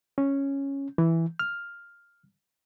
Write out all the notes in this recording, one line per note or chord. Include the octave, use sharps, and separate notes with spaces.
C#4
E3
F6